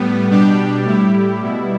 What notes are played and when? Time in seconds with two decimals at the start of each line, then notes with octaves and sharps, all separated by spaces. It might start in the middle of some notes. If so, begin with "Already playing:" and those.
Already playing: A2 G3 B3
0.29 B2 G3 D4 G4
0.85 A2 G3 E4 G4
1.42 B2 G3 E4